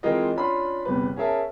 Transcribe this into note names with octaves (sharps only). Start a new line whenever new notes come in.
E3 G#3 C4 F4 A#4 D#5
C#4 D4 F4 B5 C6
G1 E2 C3 B4
C#4 G#4 A#4 E5 A5